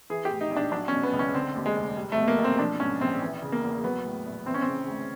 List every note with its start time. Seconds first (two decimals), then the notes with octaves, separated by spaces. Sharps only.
0.10 E3 G#4
0.25 G4
0.31 A2
0.41 D#4
0.51 A#1
0.56 D4
0.71 F#3 D4
0.88 B2 C#4
1.03 B3
1.13 C#2
1.19 C#4
1.34 D3 C4
1.56 D#2
1.66 G#3
1.76 F1
1.96 G3
2.12 A3
2.18 B2
2.28 A#3
2.38 B1
2.44 C4
2.59 F3 D4
2.80 G#2 C#4
3.01 A#1 C4
3.22 E3
3.42 C#3
3.52 A#3
3.63 E2
3.84 F#3 B3
4.05 A2
4.26 A#1
4.46 E3 C4
4.54 C#4
4.62 C4
4.67 C#3
4.88 D2